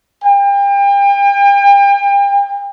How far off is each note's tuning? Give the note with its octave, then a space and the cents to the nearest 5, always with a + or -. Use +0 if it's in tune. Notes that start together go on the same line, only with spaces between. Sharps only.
G5 +35